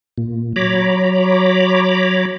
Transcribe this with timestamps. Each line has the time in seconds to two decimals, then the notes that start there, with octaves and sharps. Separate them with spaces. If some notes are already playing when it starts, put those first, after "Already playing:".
0.18 A#2
0.56 F#3 C#5 A#5 B5 D6